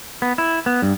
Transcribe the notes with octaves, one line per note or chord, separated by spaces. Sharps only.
B3
E4
B3
G2